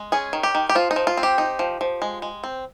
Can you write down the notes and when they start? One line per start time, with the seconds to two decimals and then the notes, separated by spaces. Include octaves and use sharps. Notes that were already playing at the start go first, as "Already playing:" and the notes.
Already playing: G#3
0.12 C#4 G#4
0.33 D#3
0.43 G4
0.55 D#3
0.69 G4
0.75 F3 F4
0.91 D#4
0.96 F3
1.07 F4
1.17 C4
1.23 G4
1.38 D#4
1.59 F3
1.81 F3
2.02 G#3
2.22 G#3
2.44 C4